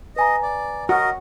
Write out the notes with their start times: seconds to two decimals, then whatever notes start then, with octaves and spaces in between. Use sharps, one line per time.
0.16 B4 D#5 G#5 A#5
0.43 D5
0.89 F#4 A#4 D#5